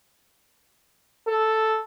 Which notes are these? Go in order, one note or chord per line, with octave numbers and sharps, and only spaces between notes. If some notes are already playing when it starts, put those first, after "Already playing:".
A4